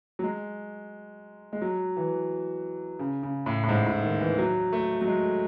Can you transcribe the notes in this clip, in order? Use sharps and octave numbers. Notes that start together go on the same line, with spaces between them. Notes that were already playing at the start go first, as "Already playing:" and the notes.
F#3
G#3
G#3
F#3
E3
C#3
C#3
A2
A2
G#2
A2
D#3
E3
F#3
A3
F#3
G#3